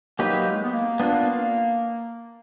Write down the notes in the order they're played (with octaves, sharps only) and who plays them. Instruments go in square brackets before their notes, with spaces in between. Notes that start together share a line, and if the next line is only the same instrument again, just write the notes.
[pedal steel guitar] F#3 A#3 D#4 G4 B4
[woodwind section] G#3
B3
A#3
[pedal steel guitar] B3 D4 F4